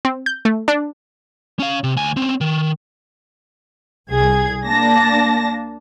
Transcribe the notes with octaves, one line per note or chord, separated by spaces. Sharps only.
C4
G6
A3
D4
C#4 F5
C3
D2 G#5
C4 C#4
D#3
C2 G#4 G#6
A#3 D4 A5 A#6